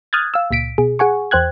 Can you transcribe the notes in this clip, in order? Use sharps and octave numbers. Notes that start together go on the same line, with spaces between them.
D#6 F6 F#6 G#6 A6
F5 E6
C#2 A#2 B6 D7
B2 G#4
G#4 F#5 G#5 C#6
E2 C5 G5 F#6 G#6